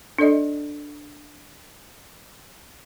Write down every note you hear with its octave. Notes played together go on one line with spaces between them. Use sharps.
D4 A4 D5 D#5